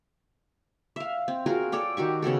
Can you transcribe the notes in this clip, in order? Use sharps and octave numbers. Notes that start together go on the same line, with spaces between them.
E5 F5
C4
F4 F#4 G#4 A#4
A4 C#5 D5 G5
D#3 F#4 G4 C#6
C#3 B3 F#4 A4